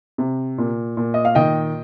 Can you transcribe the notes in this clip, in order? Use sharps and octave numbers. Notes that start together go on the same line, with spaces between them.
C3
A#2
A#2
D#5
F5
D#3 D#5 G5